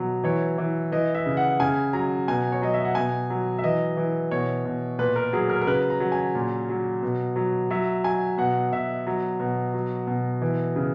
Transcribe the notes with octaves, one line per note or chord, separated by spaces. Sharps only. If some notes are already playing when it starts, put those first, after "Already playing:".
Already playing: B2 F#3
E3 C#5
E3
E3 D#5
E5
C#3
F#5
C#3 G#5
F#3 A#5
B2 G#5
C#5
F#3 D#5
E5
F#5
B2 G#5
F#3
E5
E3 D#5
E3
B2 C#5
B2
A#2 B4
A#4
F#3 G#4
A#4
A#4
C#3 B4
A#5
F#3
G#5
A#2
F#3
B2
F#3
F#3 E5
F#3 G#5
B2 F#5
B2 E5
F#3
B2
F#3
B2
E3
C#3